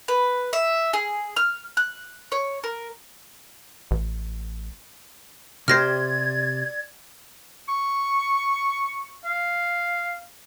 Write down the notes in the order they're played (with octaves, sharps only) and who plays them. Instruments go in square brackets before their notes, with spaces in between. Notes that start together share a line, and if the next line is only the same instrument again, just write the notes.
[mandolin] B4
E5
G#4
F6
F#6
C#5
A#4
[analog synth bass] A1
[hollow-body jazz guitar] C3 G4 C5 [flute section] D5 G#6 [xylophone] F6 A#6 C7
[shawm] C#6
F5